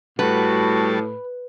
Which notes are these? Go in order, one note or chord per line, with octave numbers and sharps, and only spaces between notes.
A2 G3 F#4 B4 A5